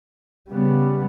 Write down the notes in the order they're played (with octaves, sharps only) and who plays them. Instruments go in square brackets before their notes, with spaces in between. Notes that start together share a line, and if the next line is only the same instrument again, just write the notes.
[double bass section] C#3 G3 B3